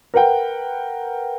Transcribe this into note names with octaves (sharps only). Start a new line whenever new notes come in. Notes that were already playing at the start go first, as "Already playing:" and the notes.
A#4 B4 F#5 G5